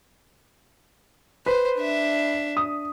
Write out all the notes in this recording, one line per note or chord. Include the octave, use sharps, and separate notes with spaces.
B4 C5
D4 E5
D#6